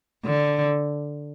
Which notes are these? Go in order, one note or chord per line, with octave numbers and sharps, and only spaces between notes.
D3